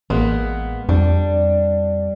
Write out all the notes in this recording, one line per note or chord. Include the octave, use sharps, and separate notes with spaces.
A1 G#3 A#3 B3
F2 G3 D4